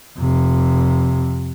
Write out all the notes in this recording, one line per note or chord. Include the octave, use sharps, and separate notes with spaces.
F2 C3